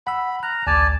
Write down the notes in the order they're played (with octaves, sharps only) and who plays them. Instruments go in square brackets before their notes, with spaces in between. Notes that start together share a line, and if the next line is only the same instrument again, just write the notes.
[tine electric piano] F#5 E6 [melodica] B5
[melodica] A#5 [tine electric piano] F6 F#6
[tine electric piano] A1 D2 [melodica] D5 G#5 A5